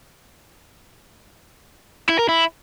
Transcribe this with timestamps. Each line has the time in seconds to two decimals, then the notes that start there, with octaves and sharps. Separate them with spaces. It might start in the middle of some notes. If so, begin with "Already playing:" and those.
2.09 E4
2.19 A#4
2.29 E4